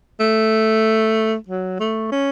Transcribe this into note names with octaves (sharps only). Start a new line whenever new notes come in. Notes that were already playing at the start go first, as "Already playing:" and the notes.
A3
F#3
A3
C#4